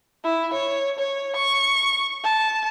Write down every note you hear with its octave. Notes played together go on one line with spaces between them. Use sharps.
E4
C#5
C#5
C#6
A5